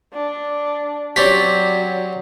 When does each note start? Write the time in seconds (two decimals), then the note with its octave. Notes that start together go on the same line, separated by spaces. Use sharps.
0.13 D4
1.16 F#3 C4 C#4 G4 D5 B6